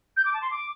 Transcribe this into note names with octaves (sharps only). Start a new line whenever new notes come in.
G6
D6
A5
C6
D6